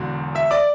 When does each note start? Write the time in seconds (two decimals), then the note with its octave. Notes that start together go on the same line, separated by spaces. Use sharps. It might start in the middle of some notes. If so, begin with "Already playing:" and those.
Already playing: E1 E2 D3 F#3
0.35 E5 E6
0.51 D5 D6